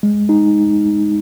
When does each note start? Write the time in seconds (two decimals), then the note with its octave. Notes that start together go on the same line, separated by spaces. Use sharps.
0.03 G#3
0.29 D#4